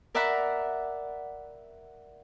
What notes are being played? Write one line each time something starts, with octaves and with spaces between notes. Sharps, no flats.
A#4 D5 E5 F#5 A#5 B5